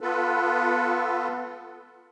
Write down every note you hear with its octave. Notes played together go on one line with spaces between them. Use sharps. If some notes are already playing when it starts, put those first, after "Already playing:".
B3 F4 A4 B4